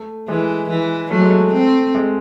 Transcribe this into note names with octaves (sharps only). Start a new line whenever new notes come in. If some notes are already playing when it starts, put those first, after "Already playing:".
Already playing: A3
E3 G#3
E3
F#3 A3
G#3
A3
C4
G#3